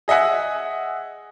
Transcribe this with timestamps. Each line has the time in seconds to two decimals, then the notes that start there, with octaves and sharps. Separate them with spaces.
0.08 G#4 D#5 E5 F#5 G#5